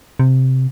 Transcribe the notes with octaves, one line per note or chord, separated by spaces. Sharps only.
C3